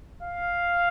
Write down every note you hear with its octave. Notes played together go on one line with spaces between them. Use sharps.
F5